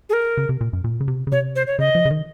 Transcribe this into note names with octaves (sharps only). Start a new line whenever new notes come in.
G#4
A#4
C#3
C3
A#2
F#2
A#2
C#3
C3
C#3
C3 C#5
C5
C#5
C#3 D#5
F3
C#3
D#3